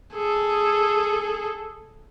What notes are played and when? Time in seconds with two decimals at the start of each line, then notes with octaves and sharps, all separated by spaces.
0.14 G#4 A4